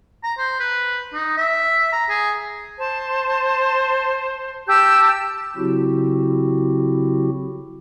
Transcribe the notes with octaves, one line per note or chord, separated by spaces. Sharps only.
A#5
C5
B4
D#4
E5
A#5
G#4
C5 A5
G4 A5 E6 G6
C#3 F#3 C4 E4 F#4 G4